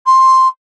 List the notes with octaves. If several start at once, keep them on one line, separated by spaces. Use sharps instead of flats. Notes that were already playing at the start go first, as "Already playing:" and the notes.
C6